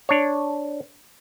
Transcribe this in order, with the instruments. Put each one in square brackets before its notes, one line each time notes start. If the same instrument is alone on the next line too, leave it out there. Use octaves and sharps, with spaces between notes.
[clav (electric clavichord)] D4 C#5